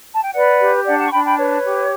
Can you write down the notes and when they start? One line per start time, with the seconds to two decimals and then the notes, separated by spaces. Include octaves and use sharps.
0.13 A5
0.23 G5
0.34 B4 D5 F#5
0.60 G4
0.86 D4 D5 F#5
0.99 F#5 A5
1.08 C#6
1.12 D4 G5 B5
1.25 G5 B5
1.38 B4 C#5
1.64 G4